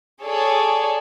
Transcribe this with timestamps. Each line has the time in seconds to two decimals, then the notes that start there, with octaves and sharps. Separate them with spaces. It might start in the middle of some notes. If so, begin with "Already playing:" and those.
0.22 G#4 A4 C#5 D5